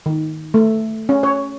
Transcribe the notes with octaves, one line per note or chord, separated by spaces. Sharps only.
D#3
A3
C#4
C#5